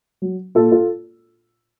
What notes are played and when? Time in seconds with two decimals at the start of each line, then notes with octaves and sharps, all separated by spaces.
0.22 F#3
0.55 A#2 F4 A4
0.72 F4 A4